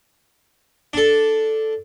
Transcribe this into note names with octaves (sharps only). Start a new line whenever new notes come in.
D4 A4